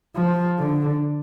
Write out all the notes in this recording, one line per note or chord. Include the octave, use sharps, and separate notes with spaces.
F3
D3